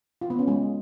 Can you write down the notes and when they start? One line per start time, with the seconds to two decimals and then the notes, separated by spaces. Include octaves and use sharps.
0.21 F4
0.30 B3
0.39 C#4
0.48 G#3